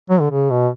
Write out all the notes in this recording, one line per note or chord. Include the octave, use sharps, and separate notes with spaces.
F#3
D3
C#3
B2